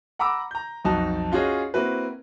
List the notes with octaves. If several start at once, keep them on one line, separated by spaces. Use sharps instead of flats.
F#5 A#5 B5 D6 E6
A#5 G6
B1 F2 D#4 F#4 A5
C#4 F4 F#4 G#4 C#5 D#5
A#3 C4 E4 F#4 B4